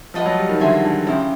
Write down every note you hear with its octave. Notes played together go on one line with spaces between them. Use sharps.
F3 B4 D#5 F#5 A5
F#3
G3
D#3
D3 G#4 C5 E5 G#5
D3
C#3 E4 G4 C5